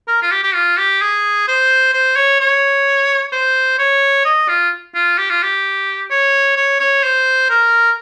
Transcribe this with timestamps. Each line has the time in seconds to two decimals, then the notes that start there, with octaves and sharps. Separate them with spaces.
0.08 A#4
0.22 F4
0.32 G4
0.44 G4
0.54 F4
0.77 G4
1.01 G#4
1.48 C5
1.93 C5
2.16 C#5
2.40 C#5
3.32 C5
3.79 C#5
4.25 D#5
4.48 F4
4.94 F4
5.18 G4
5.30 F4
5.42 G4
6.11 C#5
6.56 C#5
6.80 C#5
7.03 C5
7.50 A#4